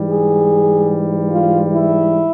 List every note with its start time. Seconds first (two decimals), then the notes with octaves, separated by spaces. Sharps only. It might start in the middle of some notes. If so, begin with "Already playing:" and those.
Already playing: G#2 E3 G3
0.09 G#4
1.31 F4
1.71 E4